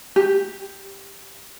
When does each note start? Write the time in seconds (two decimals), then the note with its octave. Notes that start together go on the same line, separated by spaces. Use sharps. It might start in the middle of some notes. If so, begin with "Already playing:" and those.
0.16 G4